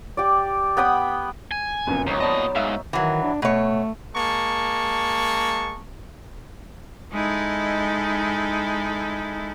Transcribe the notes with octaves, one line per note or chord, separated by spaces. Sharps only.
G4 D5
B3 G5 B5 D#6
G#5
F1 A#1 F#2
C#2 F#3 C4 D#4
A#2 B3 D5 D#5 A5
G#2 E5 F5 E6
D#3 E3 F#3
D4
B2 A3 C#5
G#3 A#3 A5 C#6
G#3 D#4 E4 A4